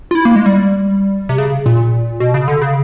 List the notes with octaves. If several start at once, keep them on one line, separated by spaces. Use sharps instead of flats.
F4
E4
A#3
G#3
G3
C3
C#3
A#2
B2
C#3
D3
C#3